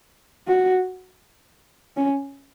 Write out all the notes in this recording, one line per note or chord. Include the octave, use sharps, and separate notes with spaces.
F#4
C#4